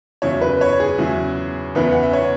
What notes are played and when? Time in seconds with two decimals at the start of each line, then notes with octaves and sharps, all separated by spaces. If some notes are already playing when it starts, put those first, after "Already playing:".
0.22 E2 C#3 F#3 E4 C#5
0.41 B4
0.61 C#5
0.80 G#4
0.98 E2 C#3 F#3 E4
1.75 E2 C#3 E3 B3 E4 B4
1.91 F#5
2.03 E5
2.13 C#5